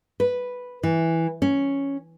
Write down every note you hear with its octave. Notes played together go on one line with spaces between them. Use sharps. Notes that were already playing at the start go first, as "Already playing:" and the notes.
B4
E3
C#4